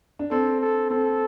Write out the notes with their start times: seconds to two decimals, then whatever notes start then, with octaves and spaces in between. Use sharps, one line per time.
0.19 D4
0.31 C4 A4
0.61 A4
0.90 C4 A4